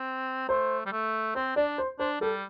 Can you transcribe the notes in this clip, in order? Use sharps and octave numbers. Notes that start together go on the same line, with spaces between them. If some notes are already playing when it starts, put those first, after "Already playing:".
Already playing: C4
A3 C5
G3
A3
C4 C5
D4 D5
C5
D4 C5
G3 A4